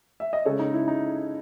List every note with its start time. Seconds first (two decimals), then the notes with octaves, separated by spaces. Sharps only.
0.20 E5
0.33 D#5
0.45 C#3 G#3 A4 C#5
0.59 D#4
0.74 E4
0.88 D#4